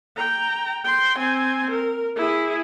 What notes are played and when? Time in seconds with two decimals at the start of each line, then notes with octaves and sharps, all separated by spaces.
0.17 G5 A#5
0.84 G5 C6
1.19 C4 G#5
1.71 A#4
2.16 E4 G#4